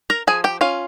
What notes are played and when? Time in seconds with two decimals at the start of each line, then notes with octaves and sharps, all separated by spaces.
0.10 A#4 A#5
0.27 F3 G#4 G#5
0.44 G4 G5
0.61 C#4 F4 F5